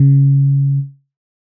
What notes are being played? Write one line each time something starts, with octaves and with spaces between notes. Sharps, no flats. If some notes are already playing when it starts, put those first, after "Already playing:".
Already playing: C#3